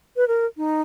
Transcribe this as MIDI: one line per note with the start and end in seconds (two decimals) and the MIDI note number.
0.16 0.28 71
0.28 0.46 70
0.57 0.82 63